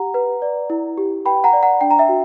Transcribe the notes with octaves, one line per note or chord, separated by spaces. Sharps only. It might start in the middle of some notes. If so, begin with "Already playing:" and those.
Already playing: G4 F#5 A#5
B4
D5
E4
G4
B4 G5 B5
F#5 A#5
D5
F#5 A#5
D4 G5
A#5
E5 G5
F#4